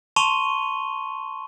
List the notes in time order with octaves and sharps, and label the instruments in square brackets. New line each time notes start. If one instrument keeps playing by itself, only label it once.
[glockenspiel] A5 C6 C#6 D#7 F7 G7